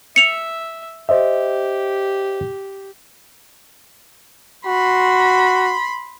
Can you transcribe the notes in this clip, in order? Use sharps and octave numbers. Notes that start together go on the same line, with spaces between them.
E5 C#7 F7
G4 C5 D#5 E5
F#4 B5 C6